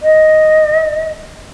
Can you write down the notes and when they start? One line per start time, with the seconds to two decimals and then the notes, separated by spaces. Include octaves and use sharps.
0.02 D#5